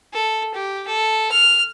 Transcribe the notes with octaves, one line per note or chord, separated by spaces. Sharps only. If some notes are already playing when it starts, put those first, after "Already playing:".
A4
G4
A4
F6